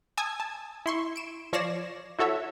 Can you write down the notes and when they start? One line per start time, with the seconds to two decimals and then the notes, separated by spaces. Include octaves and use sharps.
0.17 G#5 A5 D#6 E6 G#6
0.40 A5
0.86 E4 C6 C#6
1.16 D7 E7
1.53 F3 C#5 D5 A#6 C7 E7
2.19 E4 F#4 A4 C#5 E5